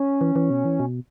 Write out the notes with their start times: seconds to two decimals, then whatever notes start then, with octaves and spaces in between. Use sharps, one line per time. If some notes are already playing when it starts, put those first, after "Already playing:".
Already playing: C#4
0.21 E3
0.36 E3
0.50 B2
0.65 E3
0.80 B2